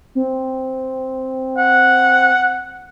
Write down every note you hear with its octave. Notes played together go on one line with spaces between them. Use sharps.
C4
F#5